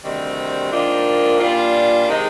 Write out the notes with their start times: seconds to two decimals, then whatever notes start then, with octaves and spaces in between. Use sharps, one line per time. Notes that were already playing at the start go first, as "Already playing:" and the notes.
0.04 D2 C3 D#3 G3 C4
0.72 G#2 D#3 A#3 D4 F4
1.39 A#2 G3 D4 F4
2.07 C3 D#3 G#3 D#4